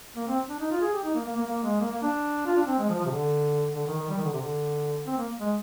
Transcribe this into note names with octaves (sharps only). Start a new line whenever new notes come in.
A#3
C4
D4
D#4
F4
G#4
G4
D#4
A#3
A#3
A#3
A#3
G#3
A#3
A#3
D4
F4
D4
C4
G#3
F3
F3
C3
D3
D3
D#3
D#3
G3
D#3
D3
C3
D3
C4
A#3
G#3